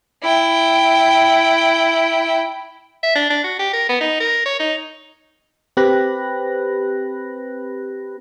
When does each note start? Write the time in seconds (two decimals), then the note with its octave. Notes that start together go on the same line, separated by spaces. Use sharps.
0.22 E4 G5
3.03 E5
3.15 D4
3.30 D4
3.44 F#4
3.59 G4
3.73 A#4
3.89 B3
4.01 D#4
4.20 A#4
4.46 C#5
4.60 D#4
5.77 C4 G4 B4 B5 F#6 A#6